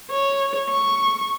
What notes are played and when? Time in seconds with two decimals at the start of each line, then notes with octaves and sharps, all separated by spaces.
0.11 C#5
0.70 C#6